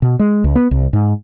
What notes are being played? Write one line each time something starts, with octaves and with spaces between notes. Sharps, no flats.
B2
G#3
C#2
B3
C2
G#2